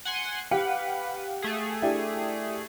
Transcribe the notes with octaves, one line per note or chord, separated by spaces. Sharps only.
F#5 G#5 C6
G4 B4 F5 F#5
A3 G#4
D4 E4 G4